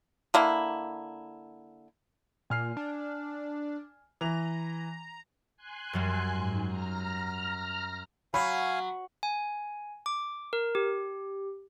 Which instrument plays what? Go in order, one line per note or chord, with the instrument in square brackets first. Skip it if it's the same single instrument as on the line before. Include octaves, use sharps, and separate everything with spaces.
[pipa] D3 A#3 E4
[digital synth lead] A#2 [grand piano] G#5 F6 C7
[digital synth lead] D4
[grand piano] E3 F7 [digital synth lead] A#5
[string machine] G#5 C6 F#6
[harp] F#2 F#3 G3
[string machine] G#2
A#5 F6
[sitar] F#3 [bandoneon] F5 G#5 [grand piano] B5
[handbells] G#5
D6
A#4
G4